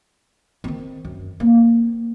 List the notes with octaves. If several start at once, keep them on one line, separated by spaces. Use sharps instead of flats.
D#3 C4
F#2
A#3 C4